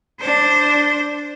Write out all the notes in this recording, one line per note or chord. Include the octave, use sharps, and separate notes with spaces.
D4 C5